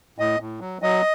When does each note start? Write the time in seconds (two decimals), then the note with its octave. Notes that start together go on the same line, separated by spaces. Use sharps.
0.18 A2 D#5
0.40 A2
0.60 F#3
0.82 F#3 D#5